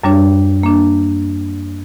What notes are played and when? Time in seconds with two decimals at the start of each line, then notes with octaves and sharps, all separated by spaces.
0.04 F#2 G3 D4 C#5
0.63 A#3 D4